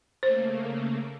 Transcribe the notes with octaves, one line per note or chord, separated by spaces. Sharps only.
C#3 A3 A#3 C5